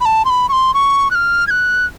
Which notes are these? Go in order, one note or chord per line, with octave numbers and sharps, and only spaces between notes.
B5
A5
C6
B5
C#6
C6
C#6
F#6
F6
G#6
F#6